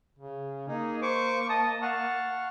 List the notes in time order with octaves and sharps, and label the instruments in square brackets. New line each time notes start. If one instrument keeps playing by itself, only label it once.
[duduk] C#3
[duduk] A#3 [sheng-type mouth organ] D#4 [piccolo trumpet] G#4
[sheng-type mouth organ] C5 D6 [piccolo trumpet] C#6
[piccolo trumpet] D#5 [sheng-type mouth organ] A5 D#6
[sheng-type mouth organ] F5 F#5 C#6 [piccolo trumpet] A5